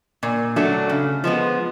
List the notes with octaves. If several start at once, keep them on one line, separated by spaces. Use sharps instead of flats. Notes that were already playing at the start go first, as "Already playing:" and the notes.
A#2
F#3 A3 D4
C#3
F3 G#3 B3